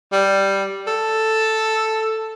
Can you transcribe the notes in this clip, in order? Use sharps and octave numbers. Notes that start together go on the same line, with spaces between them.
G3
A4